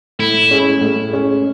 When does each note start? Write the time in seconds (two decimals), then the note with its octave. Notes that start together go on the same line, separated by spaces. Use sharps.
0.19 A2 E4
0.51 G#3 C#4 G#4
0.81 A2
1.12 G#3 C#4 G#4